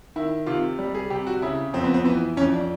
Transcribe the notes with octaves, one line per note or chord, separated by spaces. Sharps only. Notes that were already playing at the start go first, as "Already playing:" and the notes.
D#3 E4
C3 F4
G3
G#4
C3 G4
F#4
C#3 E4
F2 C4
B3
C4
E3 B3
F2 C#4
D4